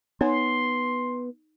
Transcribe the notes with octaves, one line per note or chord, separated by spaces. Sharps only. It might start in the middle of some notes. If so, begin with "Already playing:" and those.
B3 D#4 C#5 G#5 C6